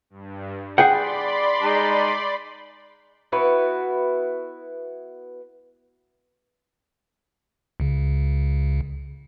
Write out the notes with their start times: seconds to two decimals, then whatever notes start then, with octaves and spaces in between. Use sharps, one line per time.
0.10 G2
0.78 G#4 D5 F#5 G5 B5 C6
1.63 G#3 D#4
3.32 B3 E4 F#4 B4
7.80 C#2 C#3